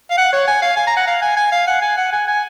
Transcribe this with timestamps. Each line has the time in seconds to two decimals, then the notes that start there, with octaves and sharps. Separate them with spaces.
0.10 F5
0.17 F#5
0.32 C#5
0.47 G#5
0.62 F5
0.77 G#5
0.87 A#5
0.97 F#5
1.07 F5
1.22 G#5
1.37 G#5
1.52 F5
1.67 F#5
1.82 G#5
1.97 F#5
2.12 G#5
2.27 G#5